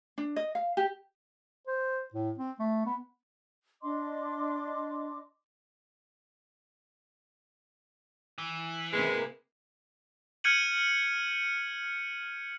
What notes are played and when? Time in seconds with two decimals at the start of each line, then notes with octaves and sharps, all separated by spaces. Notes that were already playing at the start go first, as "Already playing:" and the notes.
0.18 D4
0.36 D#5
0.55 F5
0.77 G4
1.67 C5
2.14 A2
2.38 C4
2.60 A3
2.86 B3
3.82 D4 D#5 C6 D6
8.38 E3
8.93 C3 G#3 A#3 E4 B4
10.44 F6 G6 G#6 C#7 D#7 F#7